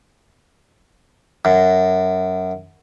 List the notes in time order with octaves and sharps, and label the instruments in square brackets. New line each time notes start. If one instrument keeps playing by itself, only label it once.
[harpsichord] F#2